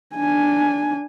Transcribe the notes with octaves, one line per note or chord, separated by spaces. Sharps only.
D4 G#5